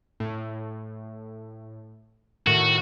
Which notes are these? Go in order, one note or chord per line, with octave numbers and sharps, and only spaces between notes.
A2
A2 D#3 F#4